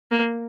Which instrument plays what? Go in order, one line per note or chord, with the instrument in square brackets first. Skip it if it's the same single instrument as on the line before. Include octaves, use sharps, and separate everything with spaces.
[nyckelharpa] A#3